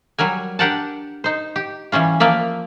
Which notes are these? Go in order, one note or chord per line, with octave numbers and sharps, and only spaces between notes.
F#3 G3 A#4 G#5
D4 G4 A#4 F#5 G5 A5
D#4 C5
G4
E3 G3 C#4 F4
F3 A#3 D5 E5